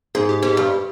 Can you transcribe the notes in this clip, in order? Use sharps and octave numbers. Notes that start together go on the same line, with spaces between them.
G#2 G#4
G4
G#2 G4
G2